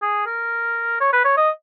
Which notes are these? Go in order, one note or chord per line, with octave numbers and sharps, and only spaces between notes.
G#4
A#4
C#5
B4
C#5
D#5